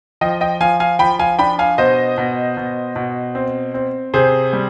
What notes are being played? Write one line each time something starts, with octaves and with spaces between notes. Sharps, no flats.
F3 D#5 G5
D#5 G5
F3 F5 G#5
F5 G#5
F3 G5 B5
F5 G#5
D4 G5 B5
F5 G#5
B2 C5 D#5
B2
B2
B2
C4
C4
C3 G#4 C5
G3